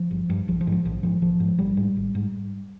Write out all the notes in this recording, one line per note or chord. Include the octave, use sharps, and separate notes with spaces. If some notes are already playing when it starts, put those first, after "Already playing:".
Already playing: F3
G1
G2
A#1 F3
F3
G#2
F3
A#1 F3
G#2 F3
A#1 F3
G#2
A#1 G3
G#2
G#1
G#2